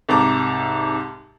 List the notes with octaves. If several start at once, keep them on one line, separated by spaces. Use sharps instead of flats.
C2 G#2 A5 A#5 D6